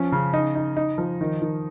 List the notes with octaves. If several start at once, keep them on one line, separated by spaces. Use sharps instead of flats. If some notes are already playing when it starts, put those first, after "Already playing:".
Already playing: F3 C#4
C#3
D#4
D#4
D#4
F3
D#3
D#3